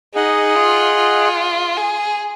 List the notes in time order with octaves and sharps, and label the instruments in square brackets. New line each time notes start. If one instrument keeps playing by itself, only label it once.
[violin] D#4 [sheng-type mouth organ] G#4 D#5 F#5
[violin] F4
F4
G#4